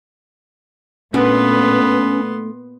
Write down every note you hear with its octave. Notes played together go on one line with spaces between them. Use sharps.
A#2 A3 B3 C#4 D4 F#4 B4 C6